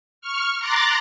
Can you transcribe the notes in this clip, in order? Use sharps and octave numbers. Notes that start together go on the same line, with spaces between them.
C#6 F6
A#5 C6 D6 F#6 A6 A#6